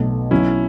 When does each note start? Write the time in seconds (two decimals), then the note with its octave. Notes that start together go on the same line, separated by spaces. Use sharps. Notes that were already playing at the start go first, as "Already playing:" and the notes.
Already playing: B1 B2 A3
0.31 B1 B2 F#3 C#4 E4